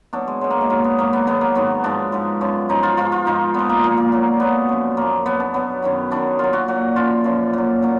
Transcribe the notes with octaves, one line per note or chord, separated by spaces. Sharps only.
B2 F#3 D4
G#3
B2 F#3 G#3
A#3
G#3
G#2 F#3 A#3
B3
G#2 F#3 A#3
B3
G#2 D#3 F#3 B3
A#3
G#2 D#3 F#3 B3
G#2 F3 D4
G#2 F3
F#2 F3
F#2 F3 D#4
F4
G#2 F3 F4
F4
G#2 F3 D#4
A#2 F3 B3
A#3
A#2 F3 A#3
A#3
A#2 F#3
A#2 F#3 B3
F#2 F3
F#2 F3 A#3
B2 F#3 B3
D4
B2 F#3 B3
F#2 D#3 F#3
F#2 D#3 F#3 D4
A#2 F#3 F4
F#4
A#2 F#3 F#4
F#2 F3 F4
F#2 F3
A#2 F#3
A#2 F#3